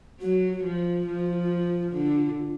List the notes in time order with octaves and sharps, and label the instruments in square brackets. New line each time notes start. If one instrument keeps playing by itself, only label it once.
[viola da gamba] F#3 [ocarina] F#4
[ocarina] F#4
[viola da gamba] F3 [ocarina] F4
[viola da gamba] F3
D3